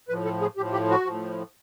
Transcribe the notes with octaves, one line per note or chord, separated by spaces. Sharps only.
A2 F3 B4
A4
G#4
A2 F3 G4
G4
F#4
A2 F3